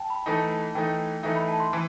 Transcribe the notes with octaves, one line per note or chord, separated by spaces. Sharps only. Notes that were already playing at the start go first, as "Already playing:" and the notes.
Already playing: G5 A5
B5
E3 A3 D#4 A5
E3 A3 D#4 G5
E3 A3 D#4 E5
B5
A5
C6
E3